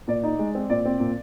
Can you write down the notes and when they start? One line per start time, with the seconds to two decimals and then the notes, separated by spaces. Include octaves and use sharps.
0.08 A#2 D5
0.23 D#4
0.39 G#3
0.55 C4
0.70 A#2 D5
0.85 C4
1.00 A#2